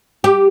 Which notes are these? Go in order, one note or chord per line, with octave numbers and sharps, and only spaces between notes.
G4